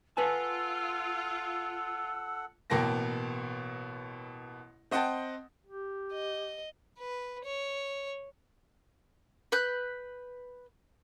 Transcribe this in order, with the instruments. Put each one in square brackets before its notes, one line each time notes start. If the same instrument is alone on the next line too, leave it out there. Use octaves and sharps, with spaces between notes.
[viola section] F4 [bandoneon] A4 F#5 [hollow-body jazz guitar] B4 G#5 A5 [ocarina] E6
[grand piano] A1 B2 A#3 G5 A5 A#6
C4 D#5 F#5 G5 A5
[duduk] G4
[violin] D#5
[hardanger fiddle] B4
C#5
[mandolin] B4 B5 F#6 G6